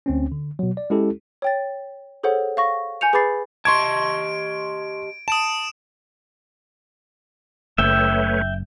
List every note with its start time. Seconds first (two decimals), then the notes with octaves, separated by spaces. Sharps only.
0.06 D2 C4 C#4
0.32 D3
0.59 B2 F#3
0.77 D5
0.90 G#3 C#4 E4 G4 A4
1.42 C#5 G5 A6
2.23 G#4 A4 C5 C#5 F#5
2.57 F5 C#6 A#6
3.01 G#5 G6 C#7 F7
3.13 G#4 B4 B5 D6 A6 C7
3.65 G4 D#5 A5 C6 C#6 G#6 D7
5.28 A5 D#6 D7 E7
7.78 F#1 A3 B4 C#5 E5 G5